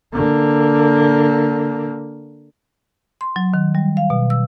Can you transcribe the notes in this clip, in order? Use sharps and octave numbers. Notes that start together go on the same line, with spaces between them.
D3 A#3
C6
F#3
D#3
G3
F5
B2
E6